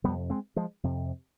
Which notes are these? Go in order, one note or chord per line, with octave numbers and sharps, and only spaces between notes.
F2 C3 G3 B3
G#3 C4
F3 G#3
F2 C3